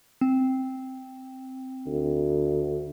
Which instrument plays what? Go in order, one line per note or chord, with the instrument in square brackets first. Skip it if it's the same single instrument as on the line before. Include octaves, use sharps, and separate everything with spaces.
[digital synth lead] C4
[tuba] D2